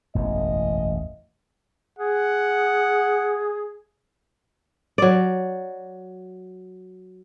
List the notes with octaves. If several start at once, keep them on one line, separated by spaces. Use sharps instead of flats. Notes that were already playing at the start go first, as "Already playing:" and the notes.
E1 A1 F#2 D#5
G#4 F#5
F#3 D5